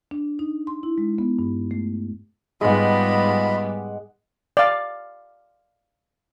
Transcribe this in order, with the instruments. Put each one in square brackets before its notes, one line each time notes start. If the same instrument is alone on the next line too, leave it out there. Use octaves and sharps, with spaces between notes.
[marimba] D4
D#4
C6
E4
G#3
B3
G2
A3
[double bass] G#2 [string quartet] G3 B3 [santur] G#3 F#5 [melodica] F4 D#5 B5
[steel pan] D5 F5